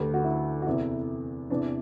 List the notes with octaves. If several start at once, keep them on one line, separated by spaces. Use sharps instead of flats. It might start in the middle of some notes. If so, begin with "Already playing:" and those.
Already playing: D2 D3 G4 B4
F#4
E4
F#4
E2 C3 E3 E4
E2 C3 E3 D4